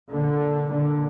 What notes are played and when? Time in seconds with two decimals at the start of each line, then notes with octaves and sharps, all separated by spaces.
0.12 A#2 D3
0.70 D3